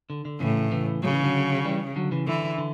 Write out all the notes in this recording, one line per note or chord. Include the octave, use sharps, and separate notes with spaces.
D3
D3
A2 C#3 E3
C#3 E3
C#3 F#3
E3
D3 F#3
E3 G3
D3 F#3
C#3 E3
D3 E3
D3